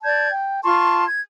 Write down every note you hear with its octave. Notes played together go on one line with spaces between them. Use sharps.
D5 A5 G6 G#6
G5
F4 A5 C6 C#6
G#6